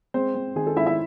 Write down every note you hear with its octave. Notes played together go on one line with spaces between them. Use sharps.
G#3 C4 C5
C4
D#3 G#4
A4
G#2 E4 E5
E4 E5